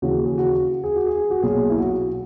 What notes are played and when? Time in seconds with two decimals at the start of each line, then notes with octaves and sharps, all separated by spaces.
0.02 D#2 C#3 E3 F#4
0.25 G#4
0.38 F#4
0.84 G#4
0.96 F#4
1.06 G#4
1.30 F#4
1.42 B1 A#2 G#4
1.70 E4
1.78 F#4